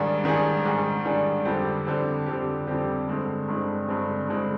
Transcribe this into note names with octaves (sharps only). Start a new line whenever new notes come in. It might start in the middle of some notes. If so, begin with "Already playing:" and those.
Already playing: G#2 D#3 G3 D4 G#4
G#2 D#3 G3 D4 G#4
G#2 D#3 G3 D4 G#4
G#2 D#3 G3 D4 G#4
F2 D3 G3 C4 G4
F2 D3 G3 C4 G4
F2 D3 G3 C4 G4
F2 D3 G3 C4 G4
G2 D3 G#3 C4
G2 D3 G#3 C4
G2 D3 G#3 C4
G2 D3 G#3 C4